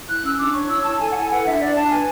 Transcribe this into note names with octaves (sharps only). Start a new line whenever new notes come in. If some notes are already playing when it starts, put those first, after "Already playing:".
E4 F#6
C#4 E6
D4 D6
C#5 C#6
E4 E6
E4 A5
A4 G#5
F#5
E4 G#5
B4 F#5
D4 E5
D4 D5
D4 A5
B4 G#5